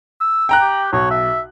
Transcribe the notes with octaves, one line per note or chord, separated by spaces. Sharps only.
E6
G5 A#5 F#6
G4
B1 C#5
E5